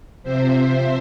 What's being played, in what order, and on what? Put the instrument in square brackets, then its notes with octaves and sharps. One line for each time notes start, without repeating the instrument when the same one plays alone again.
[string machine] C3 F3 C4 C5 E5